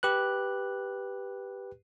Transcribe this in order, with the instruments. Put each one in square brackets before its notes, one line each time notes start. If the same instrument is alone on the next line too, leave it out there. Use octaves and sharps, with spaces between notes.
[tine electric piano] G4 B4 F#6